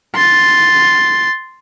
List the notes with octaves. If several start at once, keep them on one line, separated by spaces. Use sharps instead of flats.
C6 A6